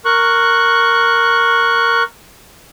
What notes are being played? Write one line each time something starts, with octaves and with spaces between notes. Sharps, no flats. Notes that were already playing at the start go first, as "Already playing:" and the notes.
A#4 C#6 F#6